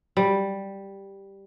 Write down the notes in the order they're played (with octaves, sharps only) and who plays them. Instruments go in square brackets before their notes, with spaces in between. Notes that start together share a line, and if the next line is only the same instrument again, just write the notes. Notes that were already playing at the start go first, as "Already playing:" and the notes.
[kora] G3